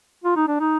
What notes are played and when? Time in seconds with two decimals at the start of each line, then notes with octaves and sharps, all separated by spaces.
0.24 F4
0.36 D#4
0.48 D4
0.60 D#4